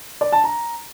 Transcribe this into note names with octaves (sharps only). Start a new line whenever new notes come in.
D5
A5
A#5